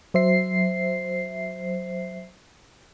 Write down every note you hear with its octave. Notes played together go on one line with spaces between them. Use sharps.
F#3 C5 E5 C7